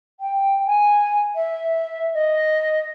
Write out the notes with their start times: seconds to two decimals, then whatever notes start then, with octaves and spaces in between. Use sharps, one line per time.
0.20 G5
0.66 G#5
1.35 E5
2.14 D#5